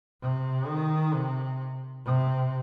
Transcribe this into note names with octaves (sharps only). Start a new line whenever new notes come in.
C3
D#3
C3
C3